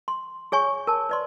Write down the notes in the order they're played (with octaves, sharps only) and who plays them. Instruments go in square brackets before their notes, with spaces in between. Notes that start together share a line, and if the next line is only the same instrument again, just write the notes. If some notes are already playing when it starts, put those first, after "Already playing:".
[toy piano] C6
G#4 C#5 G#5 C#6
A#4 A5
B4 D5 C6